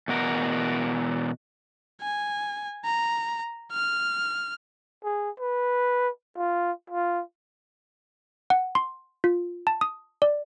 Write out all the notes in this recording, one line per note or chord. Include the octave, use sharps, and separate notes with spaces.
E2 B2 F#4 A#4
G#5
A#5
F6
G#4
B4
F4
F4
F#5
C6
F4
A5
D#6
D5